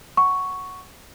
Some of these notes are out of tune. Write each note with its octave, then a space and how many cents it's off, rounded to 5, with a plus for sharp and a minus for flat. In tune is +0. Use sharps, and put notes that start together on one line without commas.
F#5 +5 C#6 +0